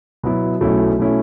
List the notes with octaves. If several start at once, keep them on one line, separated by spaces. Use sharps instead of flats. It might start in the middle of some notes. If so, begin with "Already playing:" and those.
B2 F#3 B3 E4
B1 B2 A3 C#4 E4
B2 A3 C#4 E4